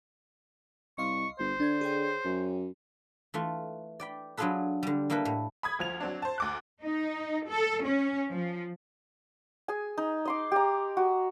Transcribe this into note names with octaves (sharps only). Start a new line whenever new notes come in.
C2 D#5 F5 C6 C#6
G1 C5
D3 D4 G#6
G#4 C#5 G5
F#2
E3 A3 F4
D5 G5 B5
F#3 D4 F4 G#4 A4 B4
D3 G3
G3 A#3 E4 A4 B4
A2
B5 D#6 G#6
D2 F3 F7
F#3 C4 D4
C5 A5
D2 D6 F#6
D#4
A4
C#4
F3
G#4 G#5
D#4
D#5 C6 D6
G4 A#5
F#4